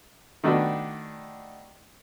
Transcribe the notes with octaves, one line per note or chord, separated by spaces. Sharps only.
D#3 A3 D4 F#4 B4